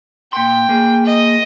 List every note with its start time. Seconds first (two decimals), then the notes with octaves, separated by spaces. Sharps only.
0.33 A#2 G5 C6
0.69 A#3 G#4
1.06 D#5